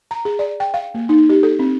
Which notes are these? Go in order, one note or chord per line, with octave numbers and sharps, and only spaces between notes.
A#5
G#4
D5
G5
F5
A#3
D#4
G4
A4
C4